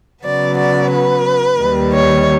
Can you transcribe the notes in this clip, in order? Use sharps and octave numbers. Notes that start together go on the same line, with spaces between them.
C#3 F#3 B3 D5
D5
B4
D#2 D#3 G3
C#5